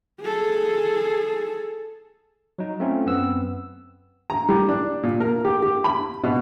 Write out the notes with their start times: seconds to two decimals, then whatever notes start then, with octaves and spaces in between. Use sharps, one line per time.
0.22 G#4 A4
2.58 F#3 D#4
2.80 A3 C4 C#4 F4
3.06 F#2 B3 C4 E6
4.30 A#5
4.49 G3
4.69 D4
5.03 A#2
5.20 A#4
5.45 G4
5.62 G4
5.84 B5
6.24 B2